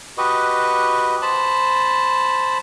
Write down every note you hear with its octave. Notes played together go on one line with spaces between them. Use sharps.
F#4 G4 B4 D#5
C5 A5 B5